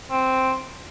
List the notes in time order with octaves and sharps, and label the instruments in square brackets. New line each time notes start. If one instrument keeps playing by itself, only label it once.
[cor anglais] C4